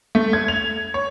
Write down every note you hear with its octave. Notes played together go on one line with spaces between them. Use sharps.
A3
G#6
F7
C#5